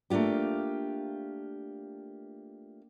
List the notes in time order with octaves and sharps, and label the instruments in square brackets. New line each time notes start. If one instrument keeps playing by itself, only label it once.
[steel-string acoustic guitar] A3 A#3 D4 F4 G4